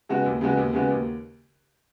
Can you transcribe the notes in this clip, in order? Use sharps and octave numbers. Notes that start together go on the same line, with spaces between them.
C#3 G#3 B3 F#4
D#2
C#3 G#3 B3 F#4
D#2
C#3 G#3 B3 F#4
D#2